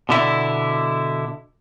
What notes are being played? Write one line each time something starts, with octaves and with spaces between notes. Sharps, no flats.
B2 D3 E4